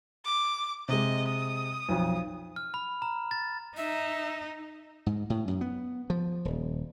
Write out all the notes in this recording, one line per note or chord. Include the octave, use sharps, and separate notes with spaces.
D6
C3 G#3 D#5
D#6
B1 F2
F6
B5
A#5
A6
D#4 E5
G#2
A2
F#2
B3
F3
D#1